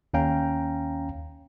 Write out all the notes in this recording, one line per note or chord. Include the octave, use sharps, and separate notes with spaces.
D#2 C#4 F5 G5 A#5